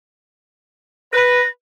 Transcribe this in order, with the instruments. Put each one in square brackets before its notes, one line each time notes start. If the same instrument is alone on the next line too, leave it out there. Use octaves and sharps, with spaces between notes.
[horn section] B4 [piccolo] A#6